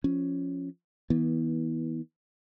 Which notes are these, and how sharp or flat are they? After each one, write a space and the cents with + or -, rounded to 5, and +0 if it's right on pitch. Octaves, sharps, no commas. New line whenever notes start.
F3 +0 C#4 +0
E3 -40 B3 -25